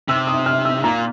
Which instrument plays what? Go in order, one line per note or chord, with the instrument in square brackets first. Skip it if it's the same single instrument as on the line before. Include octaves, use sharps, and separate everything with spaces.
[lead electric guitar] C3 [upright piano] E6
[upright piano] D#6
F6
E6
[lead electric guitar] A#2 [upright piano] A#5